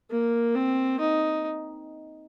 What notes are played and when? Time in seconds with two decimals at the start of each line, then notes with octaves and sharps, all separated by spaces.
0.11 A#3
0.55 C4
1.00 D#4